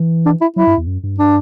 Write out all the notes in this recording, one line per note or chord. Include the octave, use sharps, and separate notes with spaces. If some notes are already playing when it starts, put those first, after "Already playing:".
Already playing: E3
D4
E4
F#3 E4
G2
E2
F#2
G2
D4